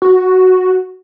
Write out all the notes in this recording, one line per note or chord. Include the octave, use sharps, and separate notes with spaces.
F#4